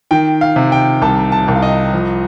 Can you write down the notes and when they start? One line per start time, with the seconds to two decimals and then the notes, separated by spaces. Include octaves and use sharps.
0.11 D#3 G5
0.41 F5
0.56 C3
0.72 G5
1.02 C2 A5
1.32 A5
1.48 C2
1.56 F5
1.62 D#5
1.93 F3